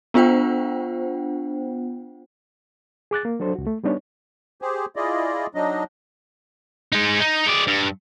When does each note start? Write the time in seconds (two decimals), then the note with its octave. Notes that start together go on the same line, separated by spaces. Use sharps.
0.14 B3 D4 F4 C5 F#5 G5
3.11 G#4 D6 F#6 A6
3.25 A#3
3.40 F#3 D4 A4 C5
3.55 C#2 F#4
3.67 A3
3.84 G3 B3 D4 D#4 C#5
4.62 G4 G#4 C5
4.96 E4 F4 G#4 D5 D#5
5.55 F#3 D4 D#4 D#5
6.92 G#3 D#4
7.20 D#4
7.47 G#3 D5
7.67 G2